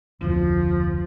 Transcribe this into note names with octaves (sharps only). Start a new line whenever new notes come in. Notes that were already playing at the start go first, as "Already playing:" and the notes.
F1 D2 F3